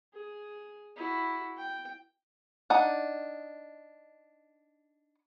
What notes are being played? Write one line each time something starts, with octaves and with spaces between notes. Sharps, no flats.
G#4
E4 F#4
G5
D4 D#4 F#5